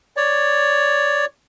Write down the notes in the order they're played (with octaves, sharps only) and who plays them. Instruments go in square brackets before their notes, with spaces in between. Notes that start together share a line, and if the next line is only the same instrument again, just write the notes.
[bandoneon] C#5 D5